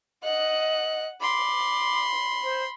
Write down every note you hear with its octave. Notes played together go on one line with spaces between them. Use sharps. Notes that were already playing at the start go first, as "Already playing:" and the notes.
D#5 F#5 F#6
B5 C6 D6
C5